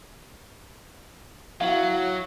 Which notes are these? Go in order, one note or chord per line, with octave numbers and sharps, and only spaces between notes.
F#3 E4 F#4 F5